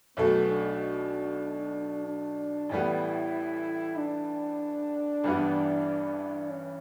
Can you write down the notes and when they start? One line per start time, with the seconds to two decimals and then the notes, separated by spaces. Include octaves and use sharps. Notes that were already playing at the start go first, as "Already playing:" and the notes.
0.16 B1 B2 A3 B3
0.49 D4
2.07 D4
2.69 A1 A2 G3 B3 E4
3.96 D4
5.24 A1 G2 E3 G3 B3
6.50 C#4